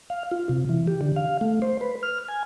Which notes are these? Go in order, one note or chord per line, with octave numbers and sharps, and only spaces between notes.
F5
F4
C3
E3
G4
D3
F5
A3
C5
B4
F6
G#5